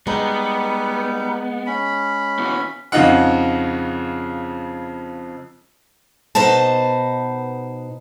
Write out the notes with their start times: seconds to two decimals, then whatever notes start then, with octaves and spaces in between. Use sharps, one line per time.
0.07 G3 G#3 B3 D#4
1.67 C#4 B5
2.39 B3 E4 F#4
2.92 F2 C#3 D#4 F4 F#5
6.35 B2 D#4 B4 C5 A5